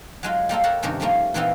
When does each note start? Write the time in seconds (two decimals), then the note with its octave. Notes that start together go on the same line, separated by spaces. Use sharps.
0.23 F#3 G#3 F4
0.49 G3 A#3 F4 A4
0.64 G4 A4 A#4 C#5 F#5 A5
0.83 G2 C3 D#3 C#4 A#4
1.00 F3 G3 A3 A#3 C#4 F4
1.34 A#2 E3 B3 C4 D#4 F4